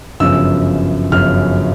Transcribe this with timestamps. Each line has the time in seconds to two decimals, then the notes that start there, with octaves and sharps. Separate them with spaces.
0.20 G1 F#2 C#3 F3 E6
1.12 G1 F#2 C#3 F3 F6